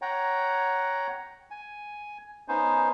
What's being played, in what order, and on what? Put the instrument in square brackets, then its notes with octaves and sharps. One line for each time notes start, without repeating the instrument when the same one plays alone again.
[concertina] C#5 F#5 G5 A#5
G#5
B3 C#4 D#4 C5